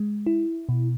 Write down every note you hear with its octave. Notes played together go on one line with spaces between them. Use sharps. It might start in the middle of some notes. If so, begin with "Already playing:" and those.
Already playing: G#3
E4
B2